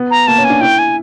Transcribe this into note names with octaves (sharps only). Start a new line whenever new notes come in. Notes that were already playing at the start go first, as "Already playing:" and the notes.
Already playing: B3
A#5
A#3 A5
C#4
G#5
D4
E4 G5
G#5